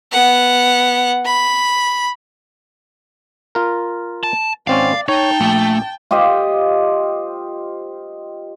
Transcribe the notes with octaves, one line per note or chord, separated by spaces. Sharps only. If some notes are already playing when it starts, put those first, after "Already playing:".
B3 F#5
B5
F4 A#4
A5
G#1 C4 C#4 D5 F5
D#4 C#5 G5 A5
A#1 A3
F4 G4 C5 D#5